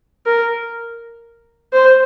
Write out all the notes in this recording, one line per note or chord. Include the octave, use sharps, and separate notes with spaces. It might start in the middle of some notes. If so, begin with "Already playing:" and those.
A#4
C5